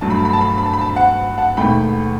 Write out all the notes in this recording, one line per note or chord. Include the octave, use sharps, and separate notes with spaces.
G1 G2 F#3 A3 A5
B5
A5
B5
A5
B5
A5
B5
A5
B5
A5
B5
F#5 A5
F#5 A5
E1 D#2 D#3 A3 G5 B5